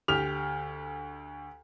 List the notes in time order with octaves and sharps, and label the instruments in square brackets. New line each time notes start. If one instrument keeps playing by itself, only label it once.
[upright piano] D2 G4 F6 F7